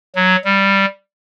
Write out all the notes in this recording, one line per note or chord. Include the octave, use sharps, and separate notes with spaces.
F#3
G3